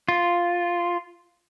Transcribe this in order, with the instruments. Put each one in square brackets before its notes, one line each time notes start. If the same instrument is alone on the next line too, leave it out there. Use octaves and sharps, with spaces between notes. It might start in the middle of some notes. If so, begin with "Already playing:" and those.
[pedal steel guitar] F4